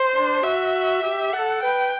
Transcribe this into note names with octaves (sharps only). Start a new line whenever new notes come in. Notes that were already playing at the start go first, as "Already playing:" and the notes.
Already playing: C5
D4
F#4 E5
G4
A4 F#5
B4 G5